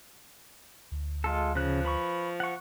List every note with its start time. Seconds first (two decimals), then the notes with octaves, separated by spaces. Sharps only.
0.92 D2
1.24 G#3 F4 A4
1.55 C#3 F3 F#6
1.85 B4 B5 C#6
2.40 F#5 C#6